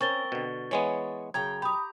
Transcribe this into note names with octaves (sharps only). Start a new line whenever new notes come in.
C4 C#4 A#4 C#6 A6 G7
B2 D3
E3 G#3 B3 C#5 G#5
F#2 C#3 G5 A#5 G#6
G4 A#5 B5 D#6